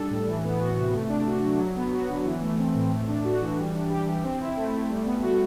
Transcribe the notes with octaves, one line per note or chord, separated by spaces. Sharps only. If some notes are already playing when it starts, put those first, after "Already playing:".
Already playing: G3 D4 A4
A2
E3
B3
F#4
C3
A3
D4
F#4
F#3
F#3
B3
F#4
D3
E3
A3
C4
A2
A3
D4
F#4
E3
G3
D4
G4
E3
C4
E4
A3
A3
G3
B3
F#4